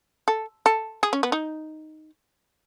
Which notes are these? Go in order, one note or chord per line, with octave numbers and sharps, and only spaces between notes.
A4
A4
G#4
C#4
B3
D#4